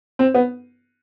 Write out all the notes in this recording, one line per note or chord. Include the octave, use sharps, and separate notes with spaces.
C4
B3